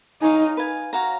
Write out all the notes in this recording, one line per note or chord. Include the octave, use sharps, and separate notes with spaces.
D#4 G#4 C#5 F5
B4 F5 G#5
F#4 C#5 F5 A#5